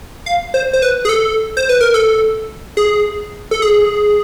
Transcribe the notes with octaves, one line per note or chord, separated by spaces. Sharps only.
F5
C5
C5
B4
G#4
A4
C5
B4
A#4
A4
G#4
A4
G#4